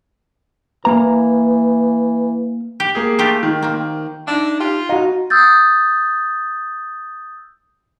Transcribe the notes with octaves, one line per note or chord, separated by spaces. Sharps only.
E3 A#3 A#5
G4
A#3 G#4
A3 F4 G4
D#3
A#3 C4
D4 D#4 E5
F4 G4
D#4 F#4 F5
D#6 E6 G6 A6